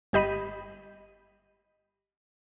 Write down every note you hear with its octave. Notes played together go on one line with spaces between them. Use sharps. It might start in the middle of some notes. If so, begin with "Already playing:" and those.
G1 G4 D#5 B5 B6 D#7